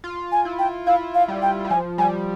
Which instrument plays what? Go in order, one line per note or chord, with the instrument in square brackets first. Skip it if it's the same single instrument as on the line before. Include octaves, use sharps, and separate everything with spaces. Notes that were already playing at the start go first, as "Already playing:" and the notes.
[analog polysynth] F4
[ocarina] G#5
[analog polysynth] E4
[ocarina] G5
[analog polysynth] E4 [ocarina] F5
[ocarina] F5
[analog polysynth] G3
[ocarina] G5
[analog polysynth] G3
[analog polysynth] F3 [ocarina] G#5
[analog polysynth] G3 [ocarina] G#5